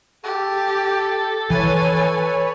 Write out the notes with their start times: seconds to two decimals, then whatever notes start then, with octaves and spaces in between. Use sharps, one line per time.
0.24 G4 A4
1.50 E3 B4 C#5 G#5